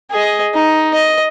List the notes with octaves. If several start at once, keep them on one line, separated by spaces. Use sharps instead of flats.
G#4 D#5
D#4
D#5